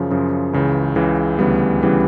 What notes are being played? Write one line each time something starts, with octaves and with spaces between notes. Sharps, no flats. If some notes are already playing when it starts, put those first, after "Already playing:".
Already playing: F#2 C#3 F3
F#2 C#3 F3
C#2 C#3 E3
C#2 C#3 E3
D2 C#3 E3 G3 B3
C#3 E3 G3 B3